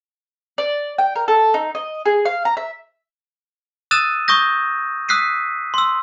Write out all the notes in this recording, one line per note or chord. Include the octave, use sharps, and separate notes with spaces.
D5
G5
A#4
A4
D#4
D#5
G#4
F5
A#5
E5
D#6 E6 F#6 A6 D#7 E7
C#6 D#6 G6 A#6
D#6 E6 F#6 B6 C7 D#7
C6 E6